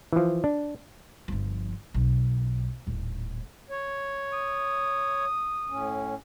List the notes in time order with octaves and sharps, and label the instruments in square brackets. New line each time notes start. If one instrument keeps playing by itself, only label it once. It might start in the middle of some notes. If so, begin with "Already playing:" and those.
[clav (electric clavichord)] E3 F3
D4
[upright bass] G1 F3
B1
D#1 A2
[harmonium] C#5
[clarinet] D#6
[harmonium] A2 C#4